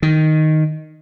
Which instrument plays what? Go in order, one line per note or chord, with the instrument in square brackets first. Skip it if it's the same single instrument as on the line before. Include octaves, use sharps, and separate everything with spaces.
[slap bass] D#3